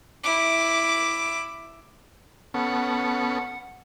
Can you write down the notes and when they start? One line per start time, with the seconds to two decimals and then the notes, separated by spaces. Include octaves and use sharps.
0.24 E4 D6
2.54 B3 C#4 A4 F#5